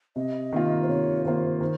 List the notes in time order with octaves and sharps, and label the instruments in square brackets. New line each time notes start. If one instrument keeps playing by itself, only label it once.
[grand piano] C3 [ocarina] D#5
[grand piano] D#3 A#3 F4
[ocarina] C5
[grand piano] C3 [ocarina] C#5
[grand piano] D#3 A#3 F4 [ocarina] C5
[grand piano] D#3 [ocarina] C5